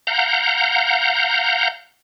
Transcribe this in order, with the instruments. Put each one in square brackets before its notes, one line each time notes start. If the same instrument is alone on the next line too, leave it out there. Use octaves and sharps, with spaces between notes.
[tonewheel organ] F5 F#5 A#5 G6